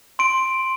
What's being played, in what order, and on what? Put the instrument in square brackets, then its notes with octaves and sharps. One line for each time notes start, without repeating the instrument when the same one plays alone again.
[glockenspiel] C6 D7